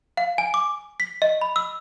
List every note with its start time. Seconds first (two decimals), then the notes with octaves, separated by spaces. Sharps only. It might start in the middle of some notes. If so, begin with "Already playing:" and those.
0.17 F5
0.38 G#5
0.54 D6
1.00 B6
1.22 D#5
1.41 B5
1.56 E6